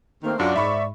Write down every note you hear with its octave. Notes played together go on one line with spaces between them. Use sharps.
D#3 A3 A#3 C4
F#2 D4 F4 F#4 D5
G#2 E5 B5 C#6